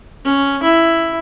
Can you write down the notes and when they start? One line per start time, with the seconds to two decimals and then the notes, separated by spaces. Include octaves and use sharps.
0.25 C#4
0.63 E4